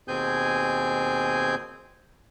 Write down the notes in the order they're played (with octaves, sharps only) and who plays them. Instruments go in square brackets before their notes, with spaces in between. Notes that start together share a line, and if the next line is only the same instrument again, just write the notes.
[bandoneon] D#2 B2 C4 G#4 G#5 G6